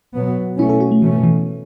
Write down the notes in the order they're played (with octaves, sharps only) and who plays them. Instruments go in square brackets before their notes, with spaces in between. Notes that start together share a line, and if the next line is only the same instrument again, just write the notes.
[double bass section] B2 F#3 B3
[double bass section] B2 A3 C#4 [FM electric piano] E4
[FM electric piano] A4
F#4
A3
[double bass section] B2 A3 C#4 [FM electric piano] E3
[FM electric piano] E3